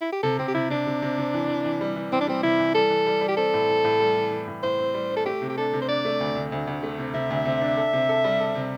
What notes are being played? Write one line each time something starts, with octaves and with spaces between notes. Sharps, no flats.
E4
G4
C3 A4
C3 C4
G4
C3 E4
C3 D4
C3
C3
C3
E3
E3
E3
G3
E3
E3 C4
D4
G3 C4
C3 E4
E3
G3 A4
E3
G3
G3
G4
C4 A4
A2
E3
A2
G3
E3
E3
A2
A2 C5
C4
G3
C4
A4
A3 G4
C3
G4
D4 A4
C3
C5
D4 D5
A3
D2
D2
D2
D2
A3
C3
C3 E5
D2
C3
D4
A4
C3
A4
G3
A4
C3